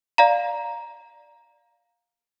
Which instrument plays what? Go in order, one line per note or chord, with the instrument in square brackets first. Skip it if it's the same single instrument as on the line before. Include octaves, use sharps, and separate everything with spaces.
[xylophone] D5 F5 A#5